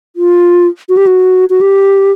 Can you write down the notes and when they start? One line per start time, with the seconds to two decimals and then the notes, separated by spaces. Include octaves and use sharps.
0.16 F4
0.89 F#4
0.97 G4
1.07 F#4
1.50 F#4
1.61 G4